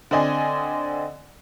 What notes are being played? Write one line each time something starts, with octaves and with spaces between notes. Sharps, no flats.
D3 C4 D5 D#5 G#5